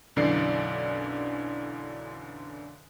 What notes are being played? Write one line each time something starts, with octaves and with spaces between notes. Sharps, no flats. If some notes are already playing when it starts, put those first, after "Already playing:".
B1 F#2 D3 E3 D5 C7